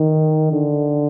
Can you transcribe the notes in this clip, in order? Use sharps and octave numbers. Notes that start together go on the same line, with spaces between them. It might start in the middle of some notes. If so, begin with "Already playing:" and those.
Already playing: D#3
D3